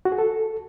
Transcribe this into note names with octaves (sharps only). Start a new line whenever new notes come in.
F#4
G#4
A4